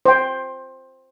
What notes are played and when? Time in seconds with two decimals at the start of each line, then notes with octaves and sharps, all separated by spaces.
0.06 C5 G5